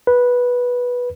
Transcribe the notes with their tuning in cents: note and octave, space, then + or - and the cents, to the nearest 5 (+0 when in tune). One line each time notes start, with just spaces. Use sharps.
B4 -10